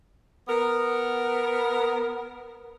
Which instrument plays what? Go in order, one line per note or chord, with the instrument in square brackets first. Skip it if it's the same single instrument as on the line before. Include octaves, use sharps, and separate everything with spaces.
[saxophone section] B3 A#4